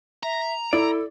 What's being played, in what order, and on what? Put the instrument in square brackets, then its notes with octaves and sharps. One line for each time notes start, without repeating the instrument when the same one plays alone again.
[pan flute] E5 [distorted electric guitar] A#5
[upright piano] E4 [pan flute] A4 [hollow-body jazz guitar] D5